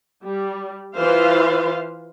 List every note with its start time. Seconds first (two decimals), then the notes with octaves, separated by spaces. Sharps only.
0.24 G3
0.95 E3 F4 B4 C5 F5